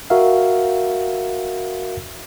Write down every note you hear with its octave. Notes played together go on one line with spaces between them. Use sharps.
F#4 A#4 E5 F5